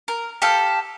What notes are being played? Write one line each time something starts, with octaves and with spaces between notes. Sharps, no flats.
A#4
G4 A4 F5